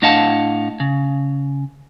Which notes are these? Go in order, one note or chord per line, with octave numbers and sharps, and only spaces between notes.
A2 D4 D#5 F5 F#5 A5
C#3